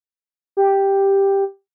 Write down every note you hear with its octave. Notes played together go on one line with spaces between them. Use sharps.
G4